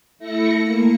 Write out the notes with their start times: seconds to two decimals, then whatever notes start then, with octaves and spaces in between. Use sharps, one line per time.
0.19 A3 E4 A#6 C#7
0.62 A#3